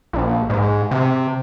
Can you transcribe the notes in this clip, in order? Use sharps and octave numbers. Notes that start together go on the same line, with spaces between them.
A#1
G#2
C3